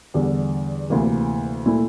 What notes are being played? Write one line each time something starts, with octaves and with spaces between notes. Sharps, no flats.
E2 D3 G3
D2 C3 E3 A#3
A#2 A3 E4